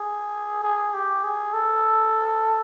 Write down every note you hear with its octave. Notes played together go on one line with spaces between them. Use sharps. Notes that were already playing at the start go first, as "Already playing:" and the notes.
Already playing: G#4
G#4
G4
G#4
A4